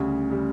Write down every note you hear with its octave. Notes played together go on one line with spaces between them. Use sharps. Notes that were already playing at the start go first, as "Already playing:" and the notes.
Already playing: D2 C#3 G3
C#3 G3